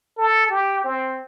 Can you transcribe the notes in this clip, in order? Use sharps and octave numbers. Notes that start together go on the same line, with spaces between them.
A4
G4
C4